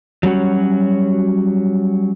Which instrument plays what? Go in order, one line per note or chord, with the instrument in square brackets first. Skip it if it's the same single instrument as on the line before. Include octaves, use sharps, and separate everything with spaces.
[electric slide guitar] F#3 G3 C#4 F#4